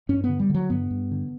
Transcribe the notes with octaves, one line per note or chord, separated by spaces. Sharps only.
G2 C#4
B3
D3
G3
D3 F#3
G2 B3
G2
D3